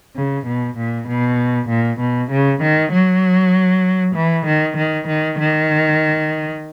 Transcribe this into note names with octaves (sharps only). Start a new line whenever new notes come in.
C#3
B2
A#2
B2
A#2
B2
C#3
D#3
F#3
E3
D#3
D#3
D#3
D#3